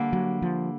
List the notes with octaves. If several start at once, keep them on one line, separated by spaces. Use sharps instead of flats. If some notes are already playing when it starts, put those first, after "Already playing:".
Already playing: D3 G3 A#3
F#3
F3